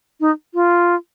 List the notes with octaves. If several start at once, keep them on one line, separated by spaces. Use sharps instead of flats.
D#4
F4